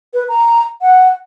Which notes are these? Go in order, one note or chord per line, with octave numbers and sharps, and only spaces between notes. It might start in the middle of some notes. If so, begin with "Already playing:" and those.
B4
A#5
F#5